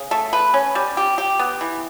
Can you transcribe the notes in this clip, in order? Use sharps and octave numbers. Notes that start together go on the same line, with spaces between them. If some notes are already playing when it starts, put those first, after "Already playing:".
Already playing: C#3
A3
B4
C#4
G3
G4
G4
B3
E3